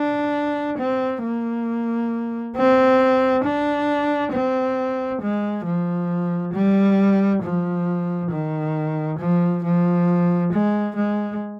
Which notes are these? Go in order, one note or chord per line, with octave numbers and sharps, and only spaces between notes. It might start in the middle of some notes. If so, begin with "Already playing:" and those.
Already playing: D4
C4
A#3
C4
D4
C4
G#3
F3
G3
F3
D#3
F3
F3
G#3
G#3